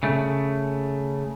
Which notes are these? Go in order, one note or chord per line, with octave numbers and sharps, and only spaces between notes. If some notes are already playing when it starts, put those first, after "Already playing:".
C#3 A3